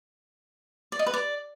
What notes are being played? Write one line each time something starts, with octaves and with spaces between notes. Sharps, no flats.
D5
D#5
B4
D5